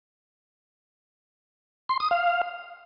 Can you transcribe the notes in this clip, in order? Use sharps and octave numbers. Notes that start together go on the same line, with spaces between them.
C6
D#6
F5